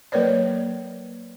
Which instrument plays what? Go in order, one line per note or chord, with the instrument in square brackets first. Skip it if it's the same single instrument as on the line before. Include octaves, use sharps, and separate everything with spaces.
[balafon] F#3 A#3 A#4 B4 C#5 D5